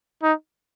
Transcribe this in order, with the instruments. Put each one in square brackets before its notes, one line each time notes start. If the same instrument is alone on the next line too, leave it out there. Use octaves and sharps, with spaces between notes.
[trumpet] D#4